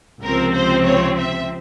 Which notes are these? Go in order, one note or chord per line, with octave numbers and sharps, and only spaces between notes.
C#2 C3 F3 C4 A#4
C5
C#5
E5